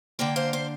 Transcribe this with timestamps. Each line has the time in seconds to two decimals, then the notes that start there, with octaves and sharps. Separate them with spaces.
0.19 D3 A#3 D4 D5 G5
0.36 C5 F5
0.53 C5 F5